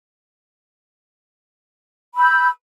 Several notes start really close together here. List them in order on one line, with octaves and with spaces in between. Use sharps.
B5 E6 G6